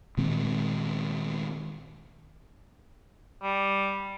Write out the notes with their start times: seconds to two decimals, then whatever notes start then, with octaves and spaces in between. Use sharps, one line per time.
0.17 A#2 D#3 G#3 C4
3.43 G3